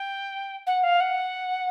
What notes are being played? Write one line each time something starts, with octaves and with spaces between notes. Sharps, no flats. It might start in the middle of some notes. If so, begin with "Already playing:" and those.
Already playing: G5
F#5
F5
F#5